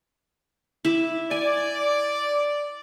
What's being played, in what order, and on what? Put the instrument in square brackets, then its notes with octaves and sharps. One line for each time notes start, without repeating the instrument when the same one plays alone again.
[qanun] E4 E5 D6
[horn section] D5 [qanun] G#5